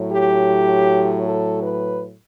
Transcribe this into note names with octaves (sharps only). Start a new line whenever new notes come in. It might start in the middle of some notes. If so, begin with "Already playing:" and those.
Already playing: A2 F#3
G4
A4
B4